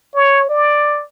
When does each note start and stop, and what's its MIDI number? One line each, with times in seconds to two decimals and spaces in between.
0.15 0.45 73
0.49 1.04 74